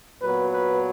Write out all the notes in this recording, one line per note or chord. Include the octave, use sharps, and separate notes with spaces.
A#2 F#3 B3 B4
B4